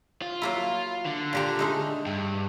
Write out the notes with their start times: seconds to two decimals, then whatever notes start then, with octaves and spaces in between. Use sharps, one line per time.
0.22 F4
0.42 F#3 A#3 E4
1.06 D3
1.33 A#2 G4 A#5
1.59 G#3 A3 D#4
2.06 G2